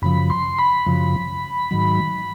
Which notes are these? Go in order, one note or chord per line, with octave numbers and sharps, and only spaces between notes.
F#2 C#3 F3 B5
C6
B5
F#2 C#3 F3
G#2 D#3 F#3